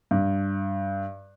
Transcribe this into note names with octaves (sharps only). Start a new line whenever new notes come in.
G2